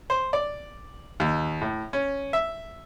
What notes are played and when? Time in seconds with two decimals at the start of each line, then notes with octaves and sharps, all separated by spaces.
0.10 C5
0.33 D5
1.20 D#2
1.61 A2
1.93 C#4
2.33 E5